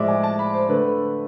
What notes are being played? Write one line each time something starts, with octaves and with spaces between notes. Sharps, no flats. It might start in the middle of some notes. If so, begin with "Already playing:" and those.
Already playing: A2 F3 G#3 D5 E5
G#5
A5
B5
C5
D3 A3 B4